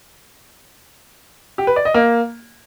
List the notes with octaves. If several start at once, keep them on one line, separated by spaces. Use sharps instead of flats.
G4
B4
D5
D#5
A#3